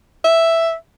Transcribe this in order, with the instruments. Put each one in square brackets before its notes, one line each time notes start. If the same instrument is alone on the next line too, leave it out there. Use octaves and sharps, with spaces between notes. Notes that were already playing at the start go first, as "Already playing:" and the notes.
[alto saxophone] E5